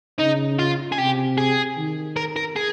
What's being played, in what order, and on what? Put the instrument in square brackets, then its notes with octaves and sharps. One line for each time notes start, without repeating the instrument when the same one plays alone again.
[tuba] C#3 [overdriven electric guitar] D#4
[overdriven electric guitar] F4
G#4
[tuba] C3 [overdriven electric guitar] G4
[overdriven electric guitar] G#4
[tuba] D#3
[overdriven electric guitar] A#4
A#4
G#4